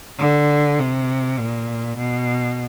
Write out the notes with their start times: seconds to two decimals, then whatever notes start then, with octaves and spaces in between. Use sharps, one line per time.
0.19 D3
0.79 C3
1.39 A#2
1.98 B2